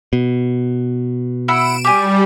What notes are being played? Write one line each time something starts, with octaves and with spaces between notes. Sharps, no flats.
B2
E4 F#5 E6 D7 E7
G3 G4 G#5